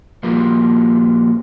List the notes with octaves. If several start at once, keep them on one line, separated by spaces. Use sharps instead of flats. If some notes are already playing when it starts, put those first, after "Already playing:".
A#2 F3 G3 A#3